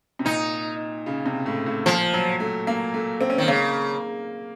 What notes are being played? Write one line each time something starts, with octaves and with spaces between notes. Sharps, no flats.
C3
A#2 D#4
C#3
C3
A2
A2
A#2 F3
F#3
A3
A#3
A3
C4
C#4
D#3 C4
C#3 A#3